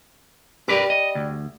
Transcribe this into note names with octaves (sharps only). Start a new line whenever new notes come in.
G3 G4 A#4 B4 D6
D#5
D2